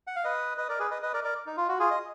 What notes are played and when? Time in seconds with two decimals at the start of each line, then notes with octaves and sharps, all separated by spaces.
0.07 F#5
0.16 F5
0.24 B4 D#5
0.58 B4 D#5
0.69 A#4 D5
0.79 G#4 B4
0.91 B4 D#5
1.02 B4 D#5
1.13 A#4 D5
1.24 A#4 D5
1.46 D#4
1.57 F4
1.69 F#4
1.79 F4 G#4
1.91 D#5